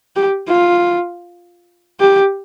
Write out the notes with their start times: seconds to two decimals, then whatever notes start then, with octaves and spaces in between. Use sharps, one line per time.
0.16 G4
0.48 F4
2.00 G4